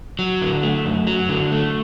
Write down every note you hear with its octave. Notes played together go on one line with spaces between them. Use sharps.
F#3
D3
A3
F#2
F#3
D3
A3